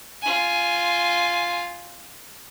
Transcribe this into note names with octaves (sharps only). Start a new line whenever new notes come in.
F4 G#5